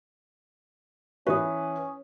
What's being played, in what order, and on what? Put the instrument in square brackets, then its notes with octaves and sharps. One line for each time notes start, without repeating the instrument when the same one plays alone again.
[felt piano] E3 B4 [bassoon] C#4 [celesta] C#6 D#6